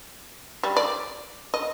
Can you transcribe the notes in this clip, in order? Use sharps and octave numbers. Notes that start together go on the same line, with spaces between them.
G3
D5
D#5